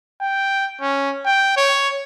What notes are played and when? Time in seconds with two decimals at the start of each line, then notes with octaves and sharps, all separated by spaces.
0.21 G5
0.81 C#4
1.26 G5
1.57 C#5